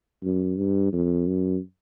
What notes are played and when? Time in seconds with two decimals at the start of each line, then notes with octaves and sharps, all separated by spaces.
0.23 F#2
0.58 G2
0.93 F2
1.27 F#2